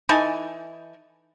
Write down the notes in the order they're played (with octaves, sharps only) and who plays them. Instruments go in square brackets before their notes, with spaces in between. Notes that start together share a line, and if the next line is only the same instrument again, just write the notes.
[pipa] E3 D#4 A4 G#5